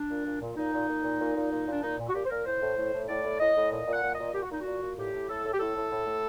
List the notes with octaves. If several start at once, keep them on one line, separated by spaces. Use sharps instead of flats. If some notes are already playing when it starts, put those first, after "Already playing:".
Already playing: D4
A#2
A#2
A#2
A#2 D#4
A#2
A#2
A#2
A#2
A#2
A#2
A#2
D4
A#2 D#4
A#2
F#4
A#2 G4
C5
A#2 A#4
A2 C5
A2
A2
A2
A2 D5
A2
A2 D#5
A2
A#2 D#5
A#2
F#5
A#2
D#5
A#2
A#2 G4
F#4
A#2 D#4
F#4
A#2
A#2
A2 G4
A2
A2 A4
A2
G4
A2 A4
A2
A2
A2